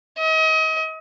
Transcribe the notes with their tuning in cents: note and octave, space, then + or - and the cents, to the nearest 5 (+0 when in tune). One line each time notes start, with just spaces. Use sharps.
D#5 +35